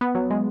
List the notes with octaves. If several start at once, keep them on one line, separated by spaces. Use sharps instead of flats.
B3
F#3
G#3